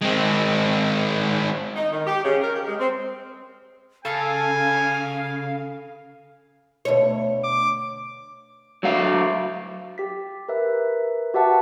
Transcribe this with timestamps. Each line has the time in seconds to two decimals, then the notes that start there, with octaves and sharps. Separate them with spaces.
0.01 G#3 C4
1.76 D#4
1.92 D#3
2.07 G4
2.24 C#3
2.41 A#4
2.55 G4
2.67 G#3
2.80 C4
4.05 C#3 A4 F5 G#5
6.85 D2 B2 C#5
7.44 D6
8.83 F#3 A3 F5
9.98 G4 B6
10.48 A#4 B4 E5
11.34 F#4 G4 B4 E5 F#5 A5